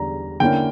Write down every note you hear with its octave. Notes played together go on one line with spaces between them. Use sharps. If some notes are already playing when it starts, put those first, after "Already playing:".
Already playing: E2 D3 G3 A#5
D3 A#3 C#4 E4 G5